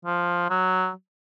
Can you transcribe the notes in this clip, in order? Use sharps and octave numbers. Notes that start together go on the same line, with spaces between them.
F3
F#3